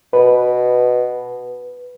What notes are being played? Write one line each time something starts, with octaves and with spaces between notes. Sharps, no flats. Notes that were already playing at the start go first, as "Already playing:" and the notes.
B2 B4